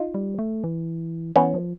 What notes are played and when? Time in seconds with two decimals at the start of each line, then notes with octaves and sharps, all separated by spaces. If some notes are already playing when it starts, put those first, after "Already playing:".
Already playing: D#4 F4
0.14 G3
0.39 A3
0.64 E3
1.36 E3 B3 C#4
1.54 F3